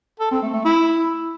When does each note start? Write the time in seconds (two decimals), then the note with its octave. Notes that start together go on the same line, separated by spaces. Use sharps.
0.20 A4
0.31 C4
0.42 A3
0.54 A3
0.65 E4